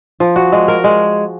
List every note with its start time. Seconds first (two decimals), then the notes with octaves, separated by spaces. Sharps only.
0.20 F3
0.36 F#4
0.52 G#3
0.68 A#4
0.84 G#3